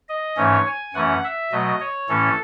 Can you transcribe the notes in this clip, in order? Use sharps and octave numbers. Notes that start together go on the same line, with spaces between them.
D#5
G#2 E3 A3 C#4 C#5
G#5
F#2 E3 A3 C#4 F#5
E5
B2 F#3 A3 D#5
C#5
A2 E3 A3 C#4 A4